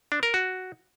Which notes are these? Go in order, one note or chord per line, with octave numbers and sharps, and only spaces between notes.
D4
A#4
F#4